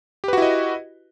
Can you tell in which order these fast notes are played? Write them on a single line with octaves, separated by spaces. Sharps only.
G4 B4 F#4 E4 D#5